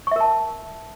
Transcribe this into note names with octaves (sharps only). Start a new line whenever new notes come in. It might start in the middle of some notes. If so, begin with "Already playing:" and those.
A#4 E5 A5 C#6